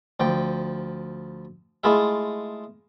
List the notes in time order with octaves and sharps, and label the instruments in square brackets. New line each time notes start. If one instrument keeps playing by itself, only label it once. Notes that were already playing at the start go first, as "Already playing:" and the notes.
[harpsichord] D2 F3 G5
G#3 A3 E4 F4 G#4 E5